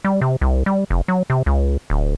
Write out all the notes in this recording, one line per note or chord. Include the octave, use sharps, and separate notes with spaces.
G3
C3
C2
G3
F1
F#3
C3
C#2
D1